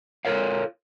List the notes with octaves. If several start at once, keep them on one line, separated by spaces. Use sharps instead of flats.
F4 A4 A#4 C#5 F5